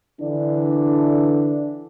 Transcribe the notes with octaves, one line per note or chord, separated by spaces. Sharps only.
D3 E3 D4